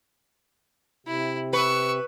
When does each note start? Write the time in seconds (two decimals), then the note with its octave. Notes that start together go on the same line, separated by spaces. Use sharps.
1.07 C3 E4
1.53 B4 C#6 E6